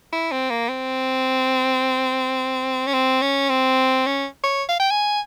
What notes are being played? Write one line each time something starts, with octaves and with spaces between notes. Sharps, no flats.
E4
C4
A#3
C4
C#4
C4
C#4
C4
C#4
C#5
F5
G5
G#5